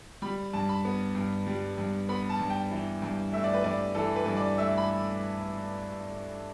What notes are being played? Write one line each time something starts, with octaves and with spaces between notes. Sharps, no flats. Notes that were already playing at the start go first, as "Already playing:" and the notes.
G3 B5
G2 A5
B5
B3
G2
G3
G2
B3 B5
A5
G2
G5
E3
G2
A3 E5
D5
B4
G2 D5
E3 A4
B4
G2
D5
A3 E5
B5